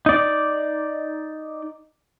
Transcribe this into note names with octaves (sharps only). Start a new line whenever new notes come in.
D#4 D5